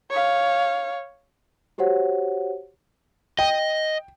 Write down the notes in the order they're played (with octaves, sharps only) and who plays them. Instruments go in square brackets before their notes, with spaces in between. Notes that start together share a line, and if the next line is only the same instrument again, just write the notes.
[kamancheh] C#5 F5
[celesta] F#4 G4 C5 C#5 F#5
[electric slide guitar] D#5 [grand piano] G5